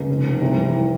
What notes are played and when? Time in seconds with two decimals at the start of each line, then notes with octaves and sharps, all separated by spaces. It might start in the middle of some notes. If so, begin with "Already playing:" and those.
Already playing: C#2
0.09 F1
0.25 F1
0.42 C2
0.58 E3